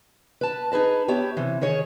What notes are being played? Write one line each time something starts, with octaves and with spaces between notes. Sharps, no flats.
B4 A5
D#4 G#4 B4 A5
B3 G4 C#5 E5
C3 E3
D#3 G#4 C#5